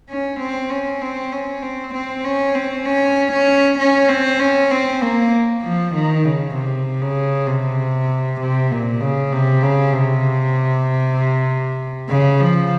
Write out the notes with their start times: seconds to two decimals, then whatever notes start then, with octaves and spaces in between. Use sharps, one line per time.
0.10 C#4
0.40 C4
0.70 C#4
1.01 C4
1.32 C#4
1.63 C4
1.94 C4
2.25 C#4
2.55 C4
2.86 C#4
3.32 C#4
3.79 C#4
4.09 C4
4.40 C#4
4.71 C4
5.02 A#3
5.63 F3
5.94 D#3
6.25 C#3
6.55 C3
7.01 C#3
7.47 C3
8.40 C3
8.71 A#2
9.01 C#3
9.32 C3
9.63 C#3
9.93 C3
12.09 C#3
12.40 F3